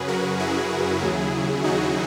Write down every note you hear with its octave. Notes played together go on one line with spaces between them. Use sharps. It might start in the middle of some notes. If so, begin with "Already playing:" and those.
Already playing: F#2 C#3 F#3 G#4 B4
F#4 A#4
E4 G#4
D#2 C#3 F#3
D#4 F#4